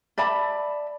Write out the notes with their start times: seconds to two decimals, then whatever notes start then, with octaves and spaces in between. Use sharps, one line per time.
0.18 D5 E5 A5 B5